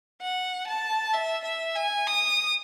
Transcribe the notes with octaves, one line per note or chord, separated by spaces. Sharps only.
F#5
A5
E5
E5
G#5
D#6